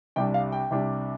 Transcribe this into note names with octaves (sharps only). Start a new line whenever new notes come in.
C2 C3 G3 D4 G5
F5
G5
C2 C3 G3 D4